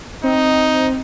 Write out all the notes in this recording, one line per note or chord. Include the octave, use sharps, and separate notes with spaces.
C4 D#4